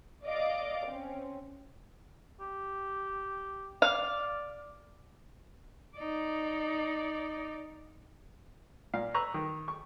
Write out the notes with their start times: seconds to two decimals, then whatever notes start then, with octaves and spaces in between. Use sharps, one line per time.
0.24 D5 D#5 F5 D6
0.86 C4 C#4
2.40 G4
3.82 D5 F5
5.97 D#4 D5
8.94 A#2 F5
9.14 B4 A#5 C#6 E6 F#6
9.34 D#3
9.68 C#6